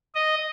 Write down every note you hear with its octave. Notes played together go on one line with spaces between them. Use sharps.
D#5